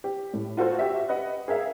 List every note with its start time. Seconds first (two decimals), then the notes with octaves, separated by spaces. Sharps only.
0.04 G4
0.34 A2
0.57 F4 F#4 A4 C5
0.79 F#4 G4 E5
1.09 B4 D#5 F#5
1.48 G#4 A#4 E5 F5